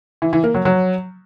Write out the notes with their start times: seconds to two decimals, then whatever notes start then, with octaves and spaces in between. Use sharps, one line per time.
0.22 E3
0.33 E3
0.44 A#3
0.55 F#3
0.65 F#3